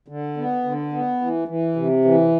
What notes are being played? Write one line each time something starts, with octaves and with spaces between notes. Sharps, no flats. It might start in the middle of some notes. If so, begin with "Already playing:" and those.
D3
B3
D3
B3
E3
E3
C3
E3